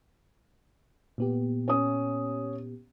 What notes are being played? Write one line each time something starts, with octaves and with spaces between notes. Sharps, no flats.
A#2 B3 G4
C#4 D#6